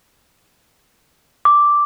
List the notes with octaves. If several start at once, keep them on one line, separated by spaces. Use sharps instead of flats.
D6